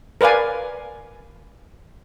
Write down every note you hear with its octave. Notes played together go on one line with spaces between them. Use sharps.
A#4 B4 D5 F5 G#5